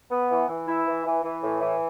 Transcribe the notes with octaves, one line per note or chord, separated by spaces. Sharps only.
B3
E3
E3
E4
E3
E3
E3
A2
E3